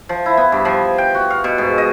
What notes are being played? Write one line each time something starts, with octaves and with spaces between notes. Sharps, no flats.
F3
E4
B3
G2
F3
G5
F#4
F5
B2
G#2
D#5